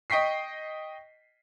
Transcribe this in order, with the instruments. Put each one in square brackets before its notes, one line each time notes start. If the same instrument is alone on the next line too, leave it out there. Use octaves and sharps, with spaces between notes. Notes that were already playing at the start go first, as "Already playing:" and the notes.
[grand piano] D#5 G5 C#6 B6 C7